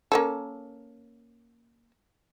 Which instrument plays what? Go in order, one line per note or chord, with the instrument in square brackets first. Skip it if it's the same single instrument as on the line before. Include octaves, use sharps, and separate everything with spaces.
[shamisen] A#3 C#4 A4